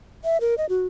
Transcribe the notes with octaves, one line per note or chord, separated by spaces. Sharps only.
E5
A#4
D#5
F#4